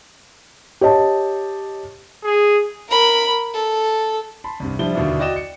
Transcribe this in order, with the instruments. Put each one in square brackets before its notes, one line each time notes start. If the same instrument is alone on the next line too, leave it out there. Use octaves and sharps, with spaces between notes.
[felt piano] G4 C#5 D#5 A5
[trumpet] G#4
[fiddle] A#4 B5
A4
[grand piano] A5 B5 C6
C2 G2 C3
F3 G3 D4 E4 G7
D#2 B2 D3 A#3 D4 E4
F#4 D5 D#5 G5 E7
C#7